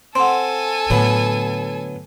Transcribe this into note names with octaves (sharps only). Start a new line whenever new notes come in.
C4 A4 F#5 G#5 C6
A2 D3 F#3 B3